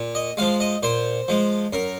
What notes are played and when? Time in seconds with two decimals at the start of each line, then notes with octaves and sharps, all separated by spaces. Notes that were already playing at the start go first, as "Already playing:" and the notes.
Already playing: A#2
0.15 D#5
0.37 F3 G#3 F5
0.60 D#5
0.83 A#2 C5
1.28 F3 G#3
1.73 F#2 A#4